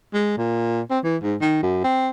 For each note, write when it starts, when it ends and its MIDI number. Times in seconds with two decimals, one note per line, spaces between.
0.14 0.34 56
0.37 0.81 46
0.90 0.99 60
1.04 1.16 52
1.23 1.36 44
1.41 1.62 51
1.63 1.81 42
1.84 2.10 60